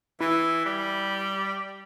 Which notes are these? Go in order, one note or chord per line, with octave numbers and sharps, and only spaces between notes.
E3 E4
G3